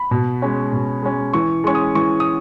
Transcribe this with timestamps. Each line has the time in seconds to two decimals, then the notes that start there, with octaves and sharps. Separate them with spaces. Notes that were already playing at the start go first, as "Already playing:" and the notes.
Already playing: B5
0.11 B2
0.42 G#3 C#4
0.73 B2
1.03 G#3 C#4
1.33 E3 C#6
1.64 G#3 C#4 C#6
1.75 D#6
1.95 E3 C#6
2.20 D#6